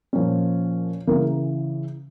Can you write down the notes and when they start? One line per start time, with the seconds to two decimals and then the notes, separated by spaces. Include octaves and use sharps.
0.13 A#2 F3 C#4
1.07 C#3 E3 A#3